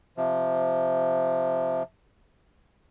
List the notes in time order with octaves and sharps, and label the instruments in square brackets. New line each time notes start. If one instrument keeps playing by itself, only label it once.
[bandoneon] C3 F3